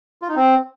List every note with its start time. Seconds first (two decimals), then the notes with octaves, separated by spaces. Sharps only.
0.22 F4
0.29 D#4
0.36 C4